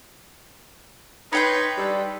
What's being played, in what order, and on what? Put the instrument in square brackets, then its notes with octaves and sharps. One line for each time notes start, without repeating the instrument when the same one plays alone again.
[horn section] D#4 B4 [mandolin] C#5 G5 C6
[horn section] G3 D4 A4